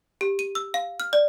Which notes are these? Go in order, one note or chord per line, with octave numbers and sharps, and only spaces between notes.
G4
D#7
E6
F5
F6
D5